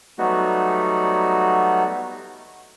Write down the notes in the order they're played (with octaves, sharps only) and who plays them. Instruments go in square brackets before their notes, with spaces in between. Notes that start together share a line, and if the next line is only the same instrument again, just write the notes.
[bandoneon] F#3 G3 A3 B3 D#4 F#4